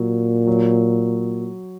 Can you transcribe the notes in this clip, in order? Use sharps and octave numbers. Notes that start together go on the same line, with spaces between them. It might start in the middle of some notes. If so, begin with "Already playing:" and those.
Already playing: A#2 F#3
F#3